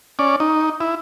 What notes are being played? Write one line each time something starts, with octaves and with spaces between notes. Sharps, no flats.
C#4 D5
D#4
E4